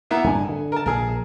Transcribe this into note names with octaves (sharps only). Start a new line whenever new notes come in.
A#3 B3 E4
D1 G2 D3 G#5
D3
A#4 A5
A#1 G#4 A#4